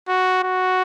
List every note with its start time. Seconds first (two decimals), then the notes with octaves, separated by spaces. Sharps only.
0.08 F#4
0.44 F#4